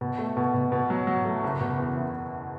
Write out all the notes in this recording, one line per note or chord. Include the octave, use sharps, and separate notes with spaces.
B2
A3
B2
B2
B2
F#3
F#3
A3
F#1
B2
E2
F#1